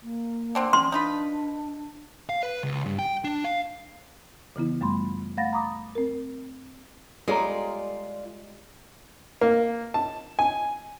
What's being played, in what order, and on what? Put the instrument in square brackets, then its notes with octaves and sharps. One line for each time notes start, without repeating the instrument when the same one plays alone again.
[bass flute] A#3
[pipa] D3 C4 D4
[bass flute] C#4 [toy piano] C6
[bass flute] D4 [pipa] D#4 F4 B4
[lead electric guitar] F5
B4
C#2
G2
G5
D4
F5
[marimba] C#3 E3 B3 E4
F#2 G3 A3 B5 C6
A3 F5 F#5 B5 A6 A#6
A#5 B5 D6 D#6
C4 A#4
[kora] G3 G#3 [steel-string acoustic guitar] F4 D5 [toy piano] A4 C#5 A#5
[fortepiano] A#3
A5
G#5